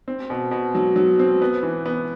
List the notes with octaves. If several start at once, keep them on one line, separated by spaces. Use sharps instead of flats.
C4
B2
B2
F#3
F#3
C4
B3
E3
B3